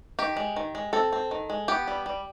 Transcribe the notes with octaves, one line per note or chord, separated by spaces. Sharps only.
D#3 G4
G#3
D#3
G#3
C4 A4
C4
D#3
G#3
B3 G4
G3
G3